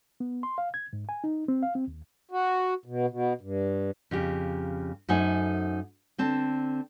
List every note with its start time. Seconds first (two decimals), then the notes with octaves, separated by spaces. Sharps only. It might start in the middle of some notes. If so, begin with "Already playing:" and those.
0.20 B3
0.43 C6
0.58 F5
0.74 G#6
0.93 G#2
1.09 G#5
1.24 D#4
1.48 C4
1.63 F5
1.75 C4
1.88 D#2
2.31 F#4
2.86 B2
3.10 B2
3.41 G2
4.11 F2 C#3 G4
5.09 F#2 A3 D#4 C5 F#5 G#5
6.18 D3 C4 A5